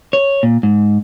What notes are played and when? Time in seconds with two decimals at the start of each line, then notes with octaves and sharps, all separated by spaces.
0.13 C#5
0.43 A#2
0.63 G#2